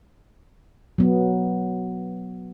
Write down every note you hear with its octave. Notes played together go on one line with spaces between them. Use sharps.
F#3 B3